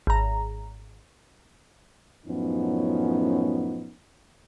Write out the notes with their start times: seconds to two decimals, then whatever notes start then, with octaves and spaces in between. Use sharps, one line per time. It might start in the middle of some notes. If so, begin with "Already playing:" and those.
0.07 G#1 A#5
2.27 F#2 A2 F3 B3 C#4 D#4